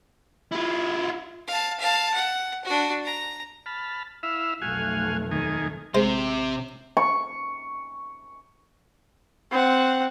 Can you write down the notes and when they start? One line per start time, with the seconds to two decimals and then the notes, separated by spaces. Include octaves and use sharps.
0.52 E4 F4
1.48 F5 A5
1.80 F5 A5
2.14 F#5
2.65 D4 F#4
3.05 A#5
3.66 A5 B5 F6
4.23 E4 E5 F5
4.62 F1 B1 A3 F#4 F5 G#5
5.31 D#2 D#3 G#5
5.95 A1 C3 G#3 C5
6.97 C#6
9.52 C4 F#5